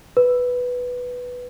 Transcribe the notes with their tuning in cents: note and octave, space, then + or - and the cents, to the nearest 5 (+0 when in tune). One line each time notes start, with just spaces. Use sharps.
B4 +0